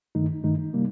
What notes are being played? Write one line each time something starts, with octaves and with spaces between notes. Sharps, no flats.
G2 D#3 A3 D#4
G2 D#3 A3 D#4
C3 G3 A#3